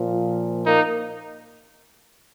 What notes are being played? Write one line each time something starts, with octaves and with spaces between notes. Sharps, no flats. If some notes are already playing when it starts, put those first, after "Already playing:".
Already playing: A#2 F3
A#3 D#4